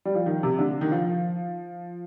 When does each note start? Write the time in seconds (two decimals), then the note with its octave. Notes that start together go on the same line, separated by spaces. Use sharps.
0.05 G3
0.15 F3
0.26 D#3
0.43 C3
0.59 D3
0.81 D#3
0.91 F3